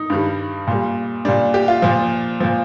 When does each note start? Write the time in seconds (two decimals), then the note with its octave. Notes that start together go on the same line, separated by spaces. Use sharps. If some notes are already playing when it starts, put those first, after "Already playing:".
Already playing: D#4
0.10 G2 D#3 G3
0.67 A#2 G3
1.25 A#2 G3 D4
1.54 G4
1.68 F4
1.82 A#2 F3
2.40 A#2 F3